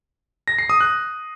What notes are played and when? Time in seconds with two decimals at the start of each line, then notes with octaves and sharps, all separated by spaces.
0.48 A#6
0.59 C7
0.70 D#6
0.81 F#6